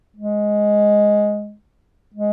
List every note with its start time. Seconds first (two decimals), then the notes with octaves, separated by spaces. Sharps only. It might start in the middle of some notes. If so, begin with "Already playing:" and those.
0.17 G#3
2.14 G#3